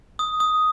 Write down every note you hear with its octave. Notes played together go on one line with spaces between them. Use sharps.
D#6
D#6